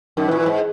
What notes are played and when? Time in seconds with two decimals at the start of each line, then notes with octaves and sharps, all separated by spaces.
0.17 F#2 D#3
0.28 E3
0.31 A#2
0.39 E3
0.46 G#2